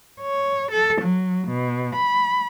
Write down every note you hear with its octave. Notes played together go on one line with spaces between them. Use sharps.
C#5
A4
F#3
B2
B5